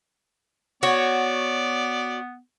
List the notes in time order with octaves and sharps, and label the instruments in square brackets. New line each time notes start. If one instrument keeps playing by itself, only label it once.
[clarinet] B3 [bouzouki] F#4 C#5 [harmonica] D5